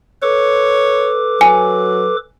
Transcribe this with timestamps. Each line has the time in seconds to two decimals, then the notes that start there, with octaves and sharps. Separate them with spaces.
0.22 A4 B4 C#5 D6
1.41 F#3 G#5